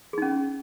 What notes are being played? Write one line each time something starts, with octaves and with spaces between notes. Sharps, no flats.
C#4 D#4 G#4